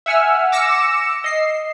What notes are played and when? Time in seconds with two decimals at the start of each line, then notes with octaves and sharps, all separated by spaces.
0.06 E5 F#5 G#5 E6 F6
0.52 D6 E6 A#6 C#7 E7
1.24 D#5 C7